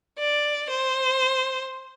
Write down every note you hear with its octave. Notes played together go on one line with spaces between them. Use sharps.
D5
C5